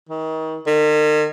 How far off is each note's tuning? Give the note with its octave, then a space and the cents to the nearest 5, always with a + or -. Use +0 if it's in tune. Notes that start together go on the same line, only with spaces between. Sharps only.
D#3 +35
D#3 -40